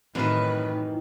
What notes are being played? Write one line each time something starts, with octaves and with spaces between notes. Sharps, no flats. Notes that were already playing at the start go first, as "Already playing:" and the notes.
F#2 A2 D#3 E3 C4 B4